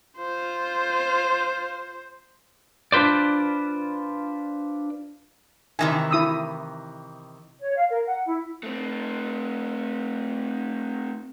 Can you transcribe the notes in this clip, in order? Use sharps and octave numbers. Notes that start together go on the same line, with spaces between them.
F4 C5
D4 F4 B4 C5 D5
C3 D#3 E3 G#5
E4 D#6 E6
C#5
F5
A#4
F#5
E4
A3 C4